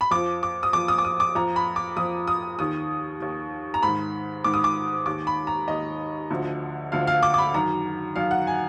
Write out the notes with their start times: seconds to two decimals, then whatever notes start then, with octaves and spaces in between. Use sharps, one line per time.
0.01 B5
0.11 F2 F3 D6
0.43 D6
0.63 D#6
0.73 F2 F3 D6
0.88 D#6
0.98 D6
1.05 D#6
1.20 D6
1.35 F2 F3 A#5
1.56 B5
1.76 D6
1.97 F2 F3 D#6
2.28 D#6
2.59 D#2 D#3 D#6
3.20 D#2 D#3
3.74 A#5
3.83 G#2 D#3 B5
4.44 G#2 D#3 D6
4.54 D#6
4.64 D6
5.06 D#2 D#3 D6
5.27 B5
5.47 A#5
5.68 D#2 D#3 D#5
6.31 D2 D3 F3
6.92 D2 D3 F3 F5
7.07 F5
7.23 D6
7.34 D6
7.38 B5
7.54 F#2 D#3 A#5
8.16 F#2 D#3 F5
8.31 F#5
8.47 G#5